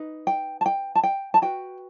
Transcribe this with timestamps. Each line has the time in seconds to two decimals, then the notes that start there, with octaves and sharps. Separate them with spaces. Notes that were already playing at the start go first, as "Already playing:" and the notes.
Already playing: D#4 B4
0.27 G5
0.61 A5
0.66 G5
0.95 A5
1.03 G5
1.34 A5
1.42 F#4 B4 G5